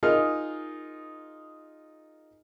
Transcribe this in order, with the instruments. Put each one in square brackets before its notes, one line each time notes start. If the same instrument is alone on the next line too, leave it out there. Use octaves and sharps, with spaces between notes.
[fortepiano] D#4 F4 G#4 A#4 F6